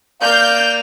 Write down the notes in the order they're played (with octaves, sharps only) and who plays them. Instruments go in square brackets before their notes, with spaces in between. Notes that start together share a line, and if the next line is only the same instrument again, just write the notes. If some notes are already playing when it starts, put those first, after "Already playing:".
[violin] A#3 F7 [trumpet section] D5 [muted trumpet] F5 [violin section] G6